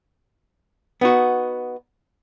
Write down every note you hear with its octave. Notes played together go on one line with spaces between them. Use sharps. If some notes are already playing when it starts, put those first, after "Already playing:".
B3 D#4 F#4